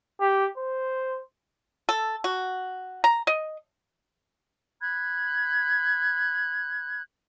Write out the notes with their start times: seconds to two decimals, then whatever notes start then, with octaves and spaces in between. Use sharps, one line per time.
0.21 G4
0.58 C5
1.89 A4
2.24 F#4
3.04 A#5
3.27 D#5
4.81 B5 F#6 G#6